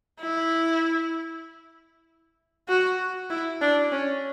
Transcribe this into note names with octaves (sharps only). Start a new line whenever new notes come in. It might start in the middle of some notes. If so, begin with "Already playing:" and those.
E4
F#4
E4
D4
C#4